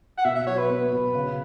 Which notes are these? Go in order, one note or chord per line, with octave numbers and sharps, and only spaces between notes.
F#5
B2 E5
E5
F#3 C#5
B4
B3
B2
C#3